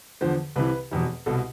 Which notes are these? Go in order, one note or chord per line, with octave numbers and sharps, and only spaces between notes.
E2 D3 F3 C5
C2 C3 E3 B4
F1 E2 B2
C2 B2 A4